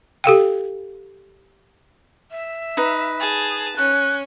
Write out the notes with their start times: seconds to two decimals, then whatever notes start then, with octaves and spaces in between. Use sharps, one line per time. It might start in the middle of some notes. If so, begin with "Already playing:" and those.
0.24 G4 A4 F5 G5
2.31 E5
2.77 D#4 B4
3.20 G#4 A5
3.78 C#4 F#6